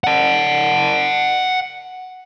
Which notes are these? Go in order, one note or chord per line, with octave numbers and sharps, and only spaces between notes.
F#5 A5